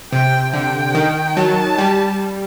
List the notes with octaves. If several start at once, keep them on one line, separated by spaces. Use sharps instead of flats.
C3 G5
D3 G5
D#3
F#3 A5
G3